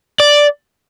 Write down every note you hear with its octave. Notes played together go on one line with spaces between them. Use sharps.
D5